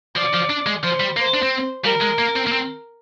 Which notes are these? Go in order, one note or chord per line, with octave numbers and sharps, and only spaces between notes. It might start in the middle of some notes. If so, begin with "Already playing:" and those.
F3 D5
F3
D4
G#3
F3 C5
G3
A#3 C5
D4
C4
G3 A#4
G#3
A#3
C4
A#3
C4